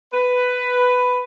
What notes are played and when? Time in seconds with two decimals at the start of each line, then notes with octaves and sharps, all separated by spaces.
0.13 B4